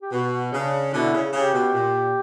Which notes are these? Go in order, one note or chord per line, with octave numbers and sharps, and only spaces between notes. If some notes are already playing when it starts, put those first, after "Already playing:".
G4
B2 F#4
C#3 D4
B2 D3 E4
C#3
C#3 G4
B2
A#2